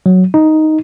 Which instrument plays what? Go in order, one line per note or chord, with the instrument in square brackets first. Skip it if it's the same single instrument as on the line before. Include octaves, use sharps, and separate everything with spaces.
[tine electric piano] F#3
D#4